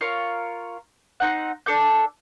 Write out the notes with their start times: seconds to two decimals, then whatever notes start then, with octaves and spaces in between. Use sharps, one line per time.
0.01 F4 A#4 C#5 F5
1.20 C4 D#4 F#5
1.66 D4 A4 D6 G6